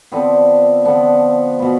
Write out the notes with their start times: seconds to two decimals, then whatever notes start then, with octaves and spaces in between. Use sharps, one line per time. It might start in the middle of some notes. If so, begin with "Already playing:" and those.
0.12 D3 F3 B3 C4
0.85 D3 F3 B3
1.59 B2 B3